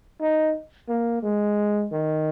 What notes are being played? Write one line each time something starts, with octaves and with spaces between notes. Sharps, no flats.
D#4
A#3
G#3
D#3